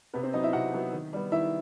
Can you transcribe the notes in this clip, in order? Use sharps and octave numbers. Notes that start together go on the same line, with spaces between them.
C3 B3 B4
C4 C5
F#3 B3 D#4 D#5
E4 E5
C3 F#4 F#5
F#3 B3
D#3
G3 B3
D#3 E4 E5